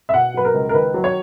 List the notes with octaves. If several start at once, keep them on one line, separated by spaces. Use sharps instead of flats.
E5
B2 F#5
F#3 B4
A#4
C#2
A#4
D#3 B4
F#3
C#5